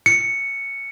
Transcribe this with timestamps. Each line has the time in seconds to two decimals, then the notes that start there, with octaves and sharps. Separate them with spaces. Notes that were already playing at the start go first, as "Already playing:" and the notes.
0.06 C#7